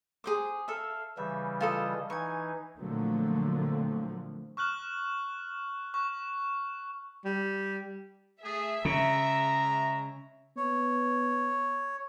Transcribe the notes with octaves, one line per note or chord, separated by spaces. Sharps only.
G#4 C5 D6
A4 E5 F5
C#3 E3 G3 E5
F4 A4 D#5
E3 D#4 G#5 C#6
A#2 D3 F3 F#3 A3 C4
C#6 F6 F#6 F#7
C#6 F#6
G3
A3 G#4 E5
C#3 G#3 A#5
B3 C#5